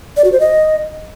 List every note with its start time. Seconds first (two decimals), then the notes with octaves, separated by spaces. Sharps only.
0.17 D5
0.24 F#4
0.32 C5
0.40 D#5